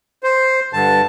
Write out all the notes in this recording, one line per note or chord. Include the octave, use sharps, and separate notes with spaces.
C5
G2 D3 A5